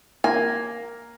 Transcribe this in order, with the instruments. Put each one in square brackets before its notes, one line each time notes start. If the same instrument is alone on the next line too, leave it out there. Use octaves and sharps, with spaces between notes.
[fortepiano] A#3 [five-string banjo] G#5